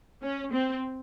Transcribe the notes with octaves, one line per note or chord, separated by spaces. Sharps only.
C#4
C4